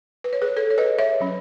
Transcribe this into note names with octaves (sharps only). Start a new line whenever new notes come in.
B4
C#5
G#4 B4
A4 C#5
C#5
B4 D#5
C#5 E5
F#3 C#4